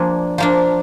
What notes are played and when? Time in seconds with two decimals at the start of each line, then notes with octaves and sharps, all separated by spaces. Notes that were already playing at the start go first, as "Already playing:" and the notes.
Already playing: F3 A#3 D4 G#5
0.38 F3 A#3 D4